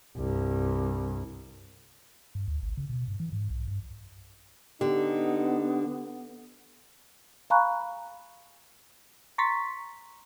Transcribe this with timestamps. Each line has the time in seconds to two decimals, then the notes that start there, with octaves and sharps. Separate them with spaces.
0.17 C2 G2
2.35 G2
2.48 D2
2.63 G#1
2.77 C#3
2.89 B2
3.08 G2
3.20 E3
3.32 G#2
3.50 B1
3.68 G2
4.81 D3 B3 D#4 G4
7.50 F5 G#5 A#5 B5 C#6 F#6
9.38 A#5 C6 C#6 A6 B6